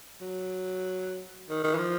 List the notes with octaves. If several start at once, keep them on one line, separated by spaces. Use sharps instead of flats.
F#3
D#3
D#3
E3
F3